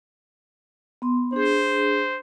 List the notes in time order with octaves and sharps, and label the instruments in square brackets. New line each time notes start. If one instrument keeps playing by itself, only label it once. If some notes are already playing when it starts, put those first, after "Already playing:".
[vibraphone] B3 C6
[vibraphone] D4 G#4 [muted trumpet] C5